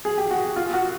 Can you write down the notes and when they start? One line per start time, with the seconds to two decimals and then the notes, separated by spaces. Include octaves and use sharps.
0.05 G#4
0.18 G4
0.31 F#4
0.56 F4
0.73 F#4